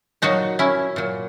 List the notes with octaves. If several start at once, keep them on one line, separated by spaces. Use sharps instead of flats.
A#2 F#3 D#4 F#4
C#4 E4
A#2 F#3